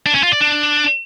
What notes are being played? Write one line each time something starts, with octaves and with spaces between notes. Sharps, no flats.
D4
C#4
F4
D5
D4